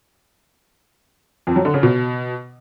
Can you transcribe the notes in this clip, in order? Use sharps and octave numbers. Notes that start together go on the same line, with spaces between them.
F2
F#3
D3
C#3
B2